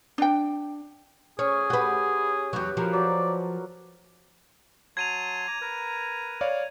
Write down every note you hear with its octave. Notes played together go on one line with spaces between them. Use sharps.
D4 G5
C#4 G#4 C#5
F#4 G4 B4
E2 F#3 B3 F#4 G4
F3 G4 A#4 B4
F#3 D5
F#3 A5 C6 G#6 D#7 F7
A#5 D6
A#4 B4 A#5
C#5 D5 F5